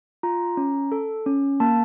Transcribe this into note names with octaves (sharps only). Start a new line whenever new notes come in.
F4 A#5
C#4
A4
C#4
A#3 A5